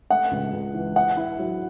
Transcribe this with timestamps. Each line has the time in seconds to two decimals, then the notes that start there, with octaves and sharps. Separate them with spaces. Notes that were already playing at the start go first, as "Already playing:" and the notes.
0.10 A3 F#5
0.31 C#2
0.53 C#2
0.74 E3
0.96 E4 F#5
1.17 E4
1.39 F#3